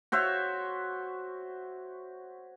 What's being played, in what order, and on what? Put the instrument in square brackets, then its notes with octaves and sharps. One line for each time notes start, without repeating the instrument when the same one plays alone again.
[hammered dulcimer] F#4 C5 C#5 E5